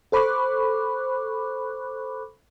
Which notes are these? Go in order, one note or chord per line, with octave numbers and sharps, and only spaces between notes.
A4 C5 B5 C#6 D6 F#6